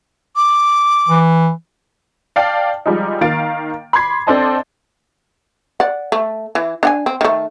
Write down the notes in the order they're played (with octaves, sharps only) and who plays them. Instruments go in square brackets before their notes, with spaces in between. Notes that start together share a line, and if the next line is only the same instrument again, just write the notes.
[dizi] D6
[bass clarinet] E3
[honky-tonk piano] D5 F5 G5 A5
F3 G3 G#3 D#4
D#3 A#3 F5 A6 D7
B5 C6 D6 G#6 C7
C4 D4 A4 C5 D#5 A5
[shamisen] D5 F#5
A3
E3
D4 F#5 G#5
C4
D#3 A3